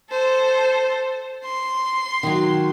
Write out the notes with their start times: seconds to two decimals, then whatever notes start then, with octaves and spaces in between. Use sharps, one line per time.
0.11 A4 C5
1.45 C6
2.23 D#3 F#3